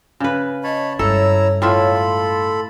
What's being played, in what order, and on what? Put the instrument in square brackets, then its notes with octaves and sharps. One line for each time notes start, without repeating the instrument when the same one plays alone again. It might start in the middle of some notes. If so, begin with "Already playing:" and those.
[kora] C#3 B4
[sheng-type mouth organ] C#5 A5 B5 [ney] D#5
[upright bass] G2 G#3 [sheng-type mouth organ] E4 A#5 E6 [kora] A4 [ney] C#5
[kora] A2 F4 E5 [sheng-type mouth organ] A4 B5 [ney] C#5
[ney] C6